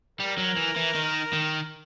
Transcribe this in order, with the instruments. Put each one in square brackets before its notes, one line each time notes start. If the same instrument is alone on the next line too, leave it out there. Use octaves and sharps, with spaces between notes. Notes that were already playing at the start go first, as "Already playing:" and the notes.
[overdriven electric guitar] G3 [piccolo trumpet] A#4
[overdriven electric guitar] F#3
E3
E3
D#3
D#3